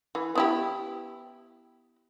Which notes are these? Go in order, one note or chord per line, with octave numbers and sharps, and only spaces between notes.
E3
B3 E4 G4